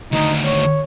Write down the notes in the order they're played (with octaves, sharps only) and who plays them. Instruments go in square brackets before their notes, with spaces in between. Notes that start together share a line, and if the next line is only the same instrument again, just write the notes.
[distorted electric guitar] D2 D#3 [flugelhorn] D#4
[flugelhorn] C#5